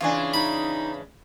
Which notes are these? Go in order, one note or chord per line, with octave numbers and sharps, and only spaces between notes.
C#3 E3 D4 F4 C#5 G#5
D#4 B5